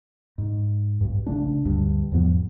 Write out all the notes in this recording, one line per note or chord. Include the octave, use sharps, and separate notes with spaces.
G#2
B1 G2
A#1 C#3 A3 D4
D2 G2
E2 G#2 F3 B3